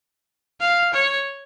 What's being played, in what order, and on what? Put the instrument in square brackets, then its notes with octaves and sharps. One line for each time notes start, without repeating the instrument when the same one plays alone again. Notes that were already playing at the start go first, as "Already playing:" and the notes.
[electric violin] F5
C#5